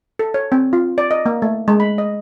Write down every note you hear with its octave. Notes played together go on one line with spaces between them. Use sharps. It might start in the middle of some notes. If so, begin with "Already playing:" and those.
A4
C#5
C4
F4
D5
D#5
A#3
A3
G#3
B5
D#5